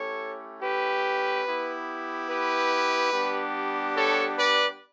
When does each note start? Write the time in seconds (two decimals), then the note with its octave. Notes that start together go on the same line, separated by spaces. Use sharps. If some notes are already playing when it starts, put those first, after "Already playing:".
Already playing: A3 C#4 E4 G4 A4 C#5
0.61 G4 B4
1.45 B3 E4 G4
2.28 G4 B4
3.12 G3 B3 D4 G4
3.95 A4 C#5
4.37 B4 D5